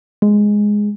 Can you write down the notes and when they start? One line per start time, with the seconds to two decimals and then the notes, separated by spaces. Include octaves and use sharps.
0.22 G#3